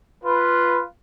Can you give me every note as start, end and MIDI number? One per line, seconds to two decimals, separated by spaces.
0.24 0.82 65
0.24 0.82 71